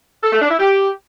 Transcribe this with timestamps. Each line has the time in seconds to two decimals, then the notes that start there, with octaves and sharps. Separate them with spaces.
0.23 A4
0.32 A3
0.41 D4
0.50 E4
0.59 G4